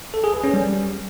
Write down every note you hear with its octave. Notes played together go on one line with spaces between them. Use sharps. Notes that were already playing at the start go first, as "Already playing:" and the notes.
A4
G#4
B4
C#4
G3